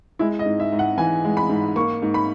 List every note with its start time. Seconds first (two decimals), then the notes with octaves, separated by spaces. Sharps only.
0.19 G#3 E4
0.39 D#5
0.45 G#2
0.60 E5
0.72 G#2
0.79 F#5
0.97 E3 G#5
1.24 G#3
1.37 B5
1.49 G#2
1.76 A#3 C#6
2.02 G#2
2.14 B5